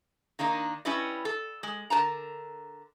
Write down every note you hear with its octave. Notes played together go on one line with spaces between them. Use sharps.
D#3 A#3 D4 D#4
G3 C#4 E4 B4 D#5
A4
G#3
D3 A#4 B4 A5 A#5